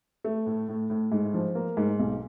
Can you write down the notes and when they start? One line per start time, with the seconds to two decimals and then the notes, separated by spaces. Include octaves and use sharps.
0.24 A3
0.47 A2
0.69 A2
0.90 A2
1.12 G#2
1.34 F3
1.55 A#3
1.77 G#2
1.99 B1